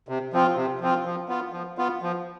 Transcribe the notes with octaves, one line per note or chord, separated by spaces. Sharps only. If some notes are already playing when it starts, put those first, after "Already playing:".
C3
F3 C4 F4
C3
F3 C4 F4
F3
B3 F4
F3
B3 F4
F3